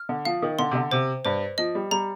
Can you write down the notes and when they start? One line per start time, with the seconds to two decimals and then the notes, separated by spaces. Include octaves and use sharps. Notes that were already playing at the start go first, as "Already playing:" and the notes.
Already playing: F6
0.09 D3
0.25 F3 F5
0.42 D#3
0.59 D3 C6
0.71 C3
0.75 D3
0.91 C3 C5
1.25 G2 C5
1.58 F3 D#5
1.75 G3
1.91 G3 A#5